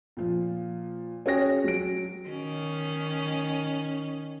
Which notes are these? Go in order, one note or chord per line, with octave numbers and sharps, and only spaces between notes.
A#2 F3
C#4 F#4 G#4 C#5 G5 A#6
F#3 D7
D#3 C#4